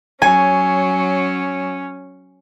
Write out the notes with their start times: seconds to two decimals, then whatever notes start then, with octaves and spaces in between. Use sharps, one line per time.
0.22 F#3 C#4 G#5